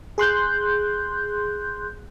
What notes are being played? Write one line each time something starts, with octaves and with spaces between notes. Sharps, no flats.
G#4 C6 F#6 G6